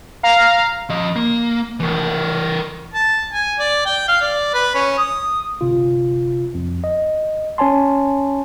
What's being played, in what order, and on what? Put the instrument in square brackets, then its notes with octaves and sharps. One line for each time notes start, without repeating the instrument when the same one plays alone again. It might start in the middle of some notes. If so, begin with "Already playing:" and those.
[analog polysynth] F5 A#5
[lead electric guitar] F3 D#5
A#3
[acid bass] F1 [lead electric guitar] E3 A#4
[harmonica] A5
G#5
D5
G5
F5
D5
B4
C#4
D#6
[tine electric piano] G1 C3 F4
F2
D#5
C#4 C#5 G#5 A5 C6